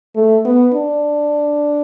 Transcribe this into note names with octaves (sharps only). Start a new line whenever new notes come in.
A3
B3
D4